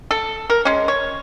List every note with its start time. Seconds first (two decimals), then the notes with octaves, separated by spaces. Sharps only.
0.11 A4
0.50 A#4
0.65 G#3 C#4
0.88 C#5